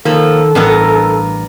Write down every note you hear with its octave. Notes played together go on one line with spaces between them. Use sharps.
D#3 F3 A#3 A4
A1 G2 B3 A#4